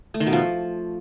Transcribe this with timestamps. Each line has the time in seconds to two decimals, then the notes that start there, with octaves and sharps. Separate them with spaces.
0.14 A3
0.20 D#3
0.26 B2
0.33 F3